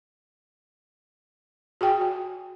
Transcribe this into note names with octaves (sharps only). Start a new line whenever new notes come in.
F#4 G#4 G5 G#5
F#4